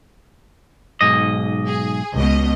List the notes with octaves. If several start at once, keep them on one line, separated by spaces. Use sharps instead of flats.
B1 G#2 D#5
G#4
C#2 B2 D#5